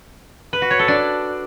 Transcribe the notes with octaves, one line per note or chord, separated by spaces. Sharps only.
B4
F#4
C#5
A4
D4